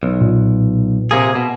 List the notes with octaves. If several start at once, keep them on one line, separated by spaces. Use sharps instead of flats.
B1
A#2
C3 A#3 G#4
B2